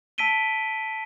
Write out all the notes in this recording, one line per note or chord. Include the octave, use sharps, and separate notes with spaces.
A5 E6 B6 D7 D#7 G7